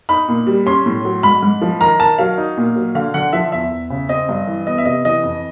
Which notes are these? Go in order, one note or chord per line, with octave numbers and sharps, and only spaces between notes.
D#4 B5
A#2
G3
C#4 C6
A2
F#3
G#2 B5
G#2
F3
D#3 A#5
D#3 A5
F#3 F5
D#4
A#2
F#3
D3 F5
D3 F#5
F3 E5
E2 E5
E2
C#3
C4 D#5
G2
E3
B3 D#5
E5
C3 D#5
E3 D#5
F2